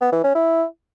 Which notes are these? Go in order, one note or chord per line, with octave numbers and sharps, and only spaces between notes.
B3
E3
C#4
E4